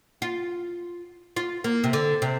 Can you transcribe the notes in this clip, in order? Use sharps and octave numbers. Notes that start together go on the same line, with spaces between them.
F4
F4
A#3
C3
D3
C3